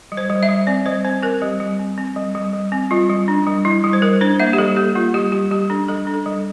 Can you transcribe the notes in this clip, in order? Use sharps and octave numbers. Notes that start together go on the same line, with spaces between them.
G3
C5
G3
E5
G3
C4 D5
G3 C5
C4 C5
C4 A#4
G3 G4
G3
C4
C4
G3
G3
G3
C4
G3 F4
G3
D4
G3
G3 E4
G3
C5
G3 A#4
D4 C5
A#3 E5
G4
G3 A4
A#3 G4
A#3 F4
G3 G4
G3 G4
G3 G4
D4 A4
G3 A4
D4
A4
G3